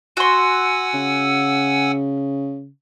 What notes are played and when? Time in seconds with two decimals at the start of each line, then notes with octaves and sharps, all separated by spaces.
0.17 F#4 F#5 G#5 C6 E6
0.94 C#3